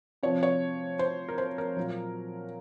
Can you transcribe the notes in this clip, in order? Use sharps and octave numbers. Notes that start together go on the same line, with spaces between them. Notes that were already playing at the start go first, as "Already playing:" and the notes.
C3 F3 C#5
C#5
C5
A#4
C5
A#4
A#2 F#3